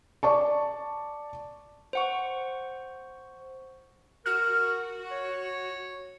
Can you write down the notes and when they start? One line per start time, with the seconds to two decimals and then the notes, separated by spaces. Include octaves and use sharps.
0.23 D5 A5 C#6
1.93 C5 F#5 C#6
4.26 F#4 A#4 F6
5.11 C#5